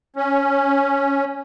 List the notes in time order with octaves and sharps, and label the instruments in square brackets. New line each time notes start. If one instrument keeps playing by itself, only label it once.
[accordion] C#4